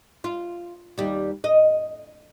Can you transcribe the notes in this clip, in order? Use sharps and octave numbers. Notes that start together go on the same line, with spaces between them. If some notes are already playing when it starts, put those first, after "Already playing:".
F4
D#2 G3
D#5